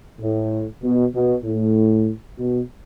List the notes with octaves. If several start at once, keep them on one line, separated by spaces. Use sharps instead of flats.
A2
B2
B2
A2
B2